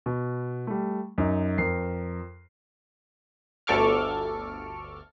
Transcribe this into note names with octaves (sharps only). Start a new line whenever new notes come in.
B2
G3 A3
F#2 D#4
F2 A#4 C7
G1 D2 A4 C#6 D6 F6